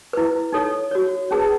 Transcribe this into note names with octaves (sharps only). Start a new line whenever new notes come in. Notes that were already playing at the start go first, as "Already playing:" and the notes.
E4 B4
D#4 A4 C#5
F#4 C#5
C#4 G#4 B4 A5